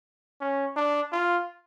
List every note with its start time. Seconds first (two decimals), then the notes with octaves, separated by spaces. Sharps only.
0.41 C#4
0.76 D4
1.12 F4